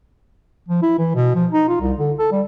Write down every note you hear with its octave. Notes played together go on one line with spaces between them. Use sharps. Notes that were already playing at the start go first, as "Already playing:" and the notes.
F3
E4
E3
B2
F3
D#4
F4
C2
D3
A4
G3